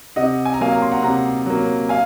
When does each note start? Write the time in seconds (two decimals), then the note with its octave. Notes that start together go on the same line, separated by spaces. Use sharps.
0.16 C3 D#5 F#5
0.45 G#5
0.54 A#5
0.60 F#3 A#3 F5 G#5
0.74 A#5
0.82 C6
0.92 F#5 A#5
1.03 C3 F#5 A#5
1.46 F#3 A#3
1.89 F5 G#5